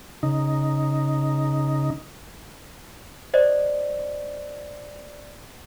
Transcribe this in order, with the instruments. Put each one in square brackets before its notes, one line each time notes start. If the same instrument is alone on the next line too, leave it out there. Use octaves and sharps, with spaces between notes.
[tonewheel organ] C#3 D#4
[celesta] C5 D5 D#5